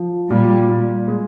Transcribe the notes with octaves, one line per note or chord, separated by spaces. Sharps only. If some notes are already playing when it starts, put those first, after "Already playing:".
Already playing: F3
A#2 G3
A#2
G#3